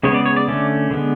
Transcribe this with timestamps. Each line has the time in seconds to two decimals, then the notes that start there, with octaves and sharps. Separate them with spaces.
0.03 C#3 G#3 B3 C#5
0.14 D5
0.26 C#5
0.36 D5
0.48 D3 A3 C#4
0.91 D3 G#3 B3